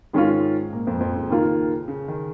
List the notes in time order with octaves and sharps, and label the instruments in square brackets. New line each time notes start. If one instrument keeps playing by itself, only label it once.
[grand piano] G#2 G#3 [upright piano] D#3 C#4 F4
[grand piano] A#2 A#3
F2 F3
F2 F3
C#3
[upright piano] D#3 A#3 F4
[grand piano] C#3
D#3